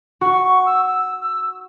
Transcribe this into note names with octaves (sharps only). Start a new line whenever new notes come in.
F#4 C#6
C#6
E6
E6
E6